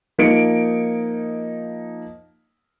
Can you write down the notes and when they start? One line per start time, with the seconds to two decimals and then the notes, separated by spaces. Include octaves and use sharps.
0.18 F3 A#3 D#4 C#7 D7